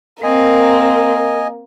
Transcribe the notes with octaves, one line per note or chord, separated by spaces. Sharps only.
A#3 C4 A#4 D#5 G#5